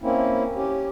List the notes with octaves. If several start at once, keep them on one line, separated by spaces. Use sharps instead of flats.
A#3 C4 C#4 E4
C#4 G4